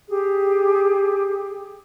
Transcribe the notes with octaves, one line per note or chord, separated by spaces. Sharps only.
G4 G#4